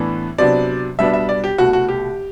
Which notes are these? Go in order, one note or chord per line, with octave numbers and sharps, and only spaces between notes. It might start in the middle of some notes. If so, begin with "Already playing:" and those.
Already playing: A2 E3 B3 D4
C3 F#3 B3 D4 D5
B2 G3 B3 D4 E5
E5
D5
G4
C2 B2 A3 F#4
F#4
G4